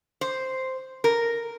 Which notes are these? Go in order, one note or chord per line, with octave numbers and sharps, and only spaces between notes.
C5
A#4